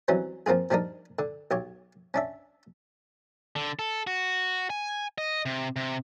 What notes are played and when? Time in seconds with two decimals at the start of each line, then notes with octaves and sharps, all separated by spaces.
0.08 E3 F#3 G3 C4 C#4
0.46 F3 A#3 C4 F4 G#4
0.71 F3 G3 D4 D#4 A#4
1.19 D3
1.51 B1 G4 C#5
2.14 C#4 D4 E5
3.56 D3
3.79 A4
4.07 F#4
4.70 G#5
5.18 D#5
5.46 C3
5.76 C3